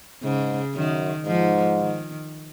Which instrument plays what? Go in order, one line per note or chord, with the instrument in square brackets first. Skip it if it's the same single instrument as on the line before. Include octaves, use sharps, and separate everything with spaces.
[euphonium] G#2 [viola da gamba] C#3
[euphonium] F#2 [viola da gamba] D#3
[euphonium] G#2 [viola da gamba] F3
[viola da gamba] D#3